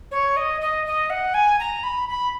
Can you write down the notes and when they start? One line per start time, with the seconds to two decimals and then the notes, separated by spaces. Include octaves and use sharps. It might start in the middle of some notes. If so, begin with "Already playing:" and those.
0.11 C#5
0.37 D#5
0.61 D#5
0.86 D#5
1.10 F#5
1.34 G#5
1.60 A#5
1.83 B5
2.09 B5